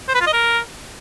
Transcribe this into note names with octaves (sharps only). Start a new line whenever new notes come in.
C5
B4
F4
D#5
A#4